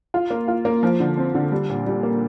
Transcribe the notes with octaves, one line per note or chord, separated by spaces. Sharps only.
F4
A#3
F4
A#3
F3
D3
C4
D3
G3
A#2
G3
A#3